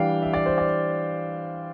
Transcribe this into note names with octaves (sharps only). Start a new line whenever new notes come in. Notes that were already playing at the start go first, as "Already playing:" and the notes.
Already playing: E3 G3 D4 F5 G5
E5
D5
C5
D5